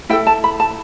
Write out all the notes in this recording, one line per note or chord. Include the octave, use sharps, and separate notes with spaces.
E4 A4 G5
A5
B5
A5